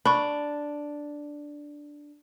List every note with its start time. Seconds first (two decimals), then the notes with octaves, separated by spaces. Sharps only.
0.05 D4 B5 C#6